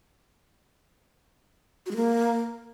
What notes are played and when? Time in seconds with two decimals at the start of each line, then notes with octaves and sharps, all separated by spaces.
1.86 F#4
1.91 G#3
1.96 A#3